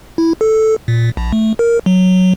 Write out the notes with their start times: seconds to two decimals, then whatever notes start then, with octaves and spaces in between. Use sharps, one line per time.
0.18 E4
0.41 A4
0.88 A#2
1.17 A#1
1.33 A3
1.59 A#4
1.86 F#3